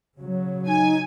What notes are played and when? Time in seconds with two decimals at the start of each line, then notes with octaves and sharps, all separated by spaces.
0.18 C#3 F#3
0.66 D#4 G#5